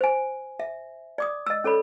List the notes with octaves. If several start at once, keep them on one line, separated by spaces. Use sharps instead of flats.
C5 G#5
E5
D5 D6 D#6
D#5 E6
C#4 A4 C#5 B5